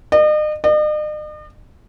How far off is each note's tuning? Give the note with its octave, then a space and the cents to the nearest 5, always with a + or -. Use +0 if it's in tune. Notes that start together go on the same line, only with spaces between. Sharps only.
D#5 -40
D#5 -45